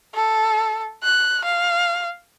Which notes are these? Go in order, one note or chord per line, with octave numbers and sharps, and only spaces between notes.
A4
F#6
F5